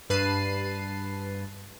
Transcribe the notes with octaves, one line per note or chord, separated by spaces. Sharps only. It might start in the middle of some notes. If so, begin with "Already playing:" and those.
G2 B4 A5 C7 D#7